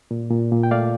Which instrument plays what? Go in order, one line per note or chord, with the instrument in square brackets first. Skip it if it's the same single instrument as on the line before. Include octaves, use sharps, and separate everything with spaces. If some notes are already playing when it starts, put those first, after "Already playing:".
[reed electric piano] A#2
A#2
A#2
G5
A3 D5 F5